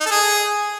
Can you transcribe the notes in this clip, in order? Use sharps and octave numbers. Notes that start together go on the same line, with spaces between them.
D#4
A4
G#4